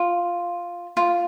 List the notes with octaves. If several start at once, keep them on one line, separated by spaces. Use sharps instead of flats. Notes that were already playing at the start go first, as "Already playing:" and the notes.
Already playing: F4
F4